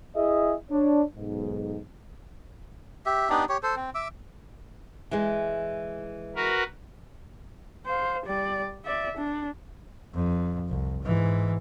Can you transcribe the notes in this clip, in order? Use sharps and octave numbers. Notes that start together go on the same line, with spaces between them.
E4 G#4 D#5 E5
D4 C#5
B1 G#2
G4 E5
B3 D4 D#4 G4
G4 C#5
A4 C5
C4
E5 D6 E6
E3 G#3
F#4 A#4 B4
C5 F5
G3 D5
D5 E5
D4
F2
C2
G#2 E3